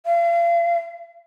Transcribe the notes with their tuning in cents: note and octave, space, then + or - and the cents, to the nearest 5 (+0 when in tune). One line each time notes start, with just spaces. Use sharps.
F5 -40